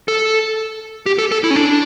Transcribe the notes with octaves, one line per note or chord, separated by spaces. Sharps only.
A4
G4
A4
A4
E4
C#4
D4